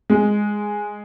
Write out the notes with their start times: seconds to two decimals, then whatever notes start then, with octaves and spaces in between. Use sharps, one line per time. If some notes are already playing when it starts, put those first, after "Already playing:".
0.10 G#3